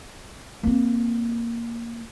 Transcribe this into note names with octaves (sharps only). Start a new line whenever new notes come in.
A#3 C4